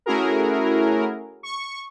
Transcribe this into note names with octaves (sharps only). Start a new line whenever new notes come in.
A3 C#4 E4 F#4 G#4 A#4
C#6